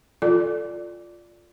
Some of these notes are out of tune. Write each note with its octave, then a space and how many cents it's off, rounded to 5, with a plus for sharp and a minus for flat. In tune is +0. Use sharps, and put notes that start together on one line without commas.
F4 +0 A4 +0 D5 +0